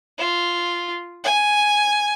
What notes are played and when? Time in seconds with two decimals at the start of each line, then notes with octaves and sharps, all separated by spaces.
0.18 F4
1.24 G#5